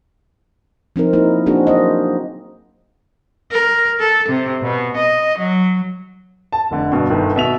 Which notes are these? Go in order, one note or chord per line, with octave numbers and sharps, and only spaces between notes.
F3 C4 D#4 A#4
A#3 D#4 E4
A#3 C4 D4 F#4 G#4
F#3 C5 D#5
A#4
A4
C3
B2
D#5
F#3
A5
F1 D3
G2 B2
G1 G2 D#3
B2 E5 F7